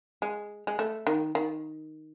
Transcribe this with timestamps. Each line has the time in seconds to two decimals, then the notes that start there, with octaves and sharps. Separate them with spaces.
0.22 G#3
0.67 G#3
0.79 A3
1.07 D#3
1.35 D#3